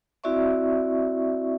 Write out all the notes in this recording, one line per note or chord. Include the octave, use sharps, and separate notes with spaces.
C4 E4 F#4 D5 E5 C#6